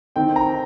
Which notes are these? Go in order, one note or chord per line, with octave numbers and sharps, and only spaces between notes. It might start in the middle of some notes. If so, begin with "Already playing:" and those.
D#3 C4 D#4 G5
A#5